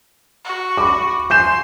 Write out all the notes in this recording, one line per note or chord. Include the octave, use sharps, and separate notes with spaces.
F#4
B5 D6
G#5 C6 G6 E7